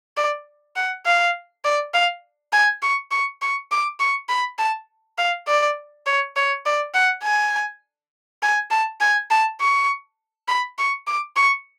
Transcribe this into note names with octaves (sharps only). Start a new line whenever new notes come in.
D5
F#5
F5
D5
F5
G#5
C#6
C#6
C#6
D6
C#6
B5
A5
F5
D5
C#5
C#5
D5
F#5
G#5
G#5
A5
G#5
A5
C#6
B5
C#6
D6
C#6